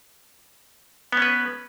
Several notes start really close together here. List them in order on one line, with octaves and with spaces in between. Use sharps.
B3 C#4 B4